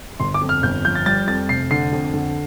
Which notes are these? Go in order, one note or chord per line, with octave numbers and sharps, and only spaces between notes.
G1 C6
D6
F2
F6
G1 G6
F3 G6
A6
G3 A6
F2 A6
F1 C7
D3 C7
F2
D3